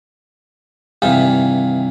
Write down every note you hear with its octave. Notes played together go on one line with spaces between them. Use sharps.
G2 C3 D#3 E3 E4 F4